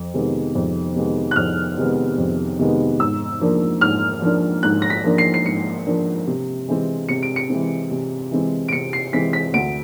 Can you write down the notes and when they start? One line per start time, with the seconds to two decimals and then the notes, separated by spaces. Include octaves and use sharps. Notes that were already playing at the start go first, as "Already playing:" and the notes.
Already playing: F2
0.14 C3 D#3 G#3 B3
0.55 F2
0.96 C3 D#3 G#3 B3
1.31 F#6
1.36 F2 F6
1.78 C3 D#3 G#3 B3
2.18 F2
2.59 C3 D#3 G#3 B3
2.99 G#2 E6
3.41 F3 A#3 D4
3.81 G#2 F6
4.22 F3 A#3 D4
4.63 G#2 F#6
4.82 A#6
4.90 B6
5.04 F3 A#3 D4
5.18 C7
5.34 C7
5.45 G#2 C#7
5.86 F3 A#3 D4
6.27 C3
6.68 E3 G#3 C4
7.09 C3 C#7
7.23 D7
7.36 C#7
7.49 E3 G#3 C4
7.91 C3
8.31 E3 G#3 C4
8.68 D7
8.72 C3 C#7
8.93 C7
9.12 E3 G#3 C4 B6
9.33 B6
9.53 D2 D7